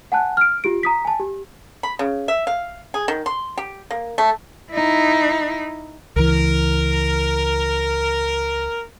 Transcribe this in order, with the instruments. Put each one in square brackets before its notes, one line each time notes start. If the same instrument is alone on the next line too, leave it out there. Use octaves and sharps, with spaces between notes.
[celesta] F#5 G#5 A5 F#6
F6 D7
F4 G4 D7
A#5 D#6 B6
G#5 A5
G4
[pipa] B5
C#3
E5
F5
G#4
D#3
C6
G4
A#3
A3
[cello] D#4 E4
[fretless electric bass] C#2 E3 [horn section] A#4